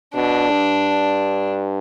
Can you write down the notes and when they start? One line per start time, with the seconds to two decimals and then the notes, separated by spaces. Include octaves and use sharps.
0.14 B2 D4
0.51 G2